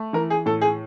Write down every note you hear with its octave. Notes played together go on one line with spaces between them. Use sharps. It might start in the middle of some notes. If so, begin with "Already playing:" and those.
Already playing: A3
E3 A#4
G#4
A2 A4
G#4